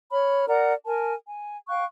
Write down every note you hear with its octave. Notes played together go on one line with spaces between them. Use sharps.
C#5 B5 F6
A#4 D5 F#5 A#5
A#4 G#5 A5
G#5
F5 G5 C#6 F#6